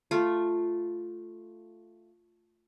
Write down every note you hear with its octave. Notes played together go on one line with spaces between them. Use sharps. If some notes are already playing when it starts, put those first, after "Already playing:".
A3 F4